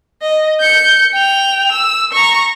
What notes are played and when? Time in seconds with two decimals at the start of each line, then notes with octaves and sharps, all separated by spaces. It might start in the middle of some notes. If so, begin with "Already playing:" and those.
0.22 D#5
0.60 G6 C#7
1.13 G5 F7
1.72 E6
2.13 A#5 C#6